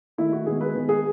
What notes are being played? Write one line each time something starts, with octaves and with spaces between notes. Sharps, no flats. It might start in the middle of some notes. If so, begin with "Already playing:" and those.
D#3 A3 E4
F#4
D#3 G#3 B3 G#4
B4
D#3 G#3 B3
G#4